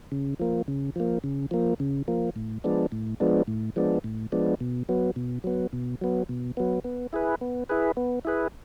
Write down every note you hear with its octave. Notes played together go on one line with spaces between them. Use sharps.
C#3
F3 A#3
C#3
F3 A#3
C#3
F3 A#3
C#3
F3 A#3
A2
F3 G#3 B3 D4
A2
F3 G#3 B3 D4
A2
F3 G#3 B3 D4
A2
F3 G#3 B3 D4
B2
F#3 B3
B2
F#3 B3
B2
F#3 B3
B2
F#3 B3
B3
E4 G#4 B4
B3
E4 G#4 B4
B3
E4 G#4 B4